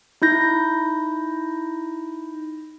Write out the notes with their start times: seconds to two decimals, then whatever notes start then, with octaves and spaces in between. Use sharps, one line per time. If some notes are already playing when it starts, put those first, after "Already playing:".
0.22 D#4 E4 G6 A#6